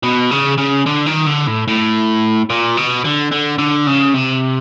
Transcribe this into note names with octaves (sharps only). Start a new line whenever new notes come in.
B2
C#3
C#3
D3
D#3
D3
A2
A2
A#2
B2
D3
D3
D3
C#3
C3